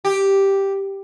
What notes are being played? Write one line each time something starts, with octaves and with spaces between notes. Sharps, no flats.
G4